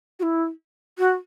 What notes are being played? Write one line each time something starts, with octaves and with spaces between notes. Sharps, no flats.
F#4
E4
F#4